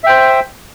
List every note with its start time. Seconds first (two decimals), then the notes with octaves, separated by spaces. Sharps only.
0.04 E5
0.06 G5
0.09 C5